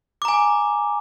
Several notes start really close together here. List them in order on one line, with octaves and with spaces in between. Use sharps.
D6 A#5 G#5